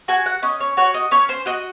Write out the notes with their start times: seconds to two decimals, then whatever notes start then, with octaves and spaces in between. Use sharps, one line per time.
0.08 F#4 G#5
0.26 F#5
0.43 C#4 D#5
0.60 C#5
0.77 F#4 C#5
0.94 D#5
1.11 C#4 C#5
1.29 C5
1.46 F#4 D#5